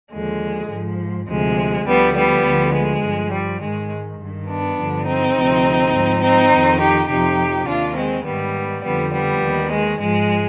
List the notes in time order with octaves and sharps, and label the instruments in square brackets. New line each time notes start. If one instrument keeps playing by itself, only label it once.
[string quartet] D#2 D3 F3 G#3
G#2 F3
D2 C3 F3 G#3
D2 D3 F3 G3 B3
G3 B3
D2 D3 F3
G#3
G2 F3
G3
G#2 D#3 G#3
G2 D#3
B3 D4
G2 D3 F3
C4 D#4
D2 C3 F3
G#2 F3
C4 D#4
F2 D#3
D#4 G4
F2 C3 F3 D#4 G4
D#2 D#3 D4 F4
G#3 C4
G#2 D#3 G3 B3
F2 D3 F3 G3 B3
G3 B3
D#2 D#3
G#3
G#2 F3 G#3